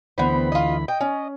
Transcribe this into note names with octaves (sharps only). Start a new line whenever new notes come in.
D2 E3 B3 C4 B5
F4 D#5
D#5 G5
C#4